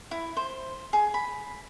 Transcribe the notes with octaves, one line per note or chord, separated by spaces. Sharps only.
E4
C5
G#4
B5